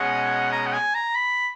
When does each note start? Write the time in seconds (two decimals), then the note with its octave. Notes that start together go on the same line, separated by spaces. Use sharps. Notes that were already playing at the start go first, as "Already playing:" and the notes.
Already playing: B2 G#3 C#4 G#4 D#5 F#5
0.52 A#5
0.66 F#5
0.73 G#5
0.94 A#5
1.16 B5